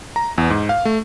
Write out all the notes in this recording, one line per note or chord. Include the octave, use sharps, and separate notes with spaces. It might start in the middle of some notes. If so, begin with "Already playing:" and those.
A#5
E2
G#2
F5
A3